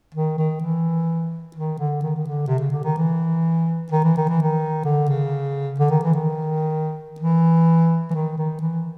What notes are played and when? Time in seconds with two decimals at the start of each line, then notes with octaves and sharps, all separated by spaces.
0.14 D#3
0.38 D#3
0.61 E3
1.56 D#3
1.79 D3
2.03 D#3
2.16 D#3
2.27 D3
2.47 C3
2.59 C#3
2.72 D3
2.84 D#3
2.97 E3
3.92 D#3
4.04 E3
4.17 D#3
4.29 E3
4.42 D#3
4.85 D3
5.09 C#3
5.80 D3
5.91 D#3
6.03 E3
6.15 D#3
7.20 E3
8.11 E3
8.14 D#3
8.38 D#3
8.61 E3